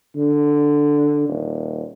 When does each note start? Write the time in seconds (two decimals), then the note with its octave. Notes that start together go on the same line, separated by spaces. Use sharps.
0.16 D3
1.29 D#1